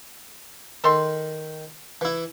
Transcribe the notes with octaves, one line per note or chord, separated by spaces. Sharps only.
D#3 A4 C6
E3 E4